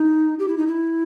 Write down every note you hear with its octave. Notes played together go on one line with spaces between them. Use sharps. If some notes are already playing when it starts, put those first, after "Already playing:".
Already playing: D#4
G4
E4
D#4
E4